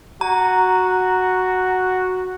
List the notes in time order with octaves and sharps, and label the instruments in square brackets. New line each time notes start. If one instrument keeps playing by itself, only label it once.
[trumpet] F#4 [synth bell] A#5